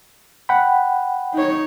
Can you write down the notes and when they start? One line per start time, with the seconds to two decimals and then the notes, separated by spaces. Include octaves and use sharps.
0.49 F#5 G5 B5
1.33 D#4 C#5